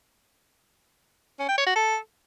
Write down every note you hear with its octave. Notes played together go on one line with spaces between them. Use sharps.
C#4
G5
C#5
F#4
A4